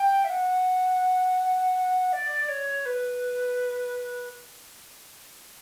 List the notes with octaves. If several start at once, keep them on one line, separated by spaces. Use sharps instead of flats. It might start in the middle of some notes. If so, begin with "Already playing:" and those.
Already playing: G5
E5
F#5
D5
C#5
B4